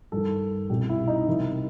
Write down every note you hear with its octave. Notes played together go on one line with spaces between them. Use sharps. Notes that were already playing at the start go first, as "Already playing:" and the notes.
G2 D#3 A4
C2 B2 G4
E4
D#4
C2 C3 D#3 E4